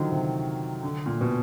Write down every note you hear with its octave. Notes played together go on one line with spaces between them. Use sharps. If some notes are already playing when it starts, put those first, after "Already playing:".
Already playing: D3 D#3 F3 F#3
C3
D3
A#2
B2